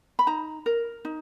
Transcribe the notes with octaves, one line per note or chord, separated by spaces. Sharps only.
B5
D#4 A#5
A#4
D#4